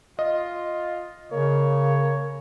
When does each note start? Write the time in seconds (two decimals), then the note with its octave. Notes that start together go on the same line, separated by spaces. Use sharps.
0.19 F4 D#5
1.32 C#3 A#3 C#5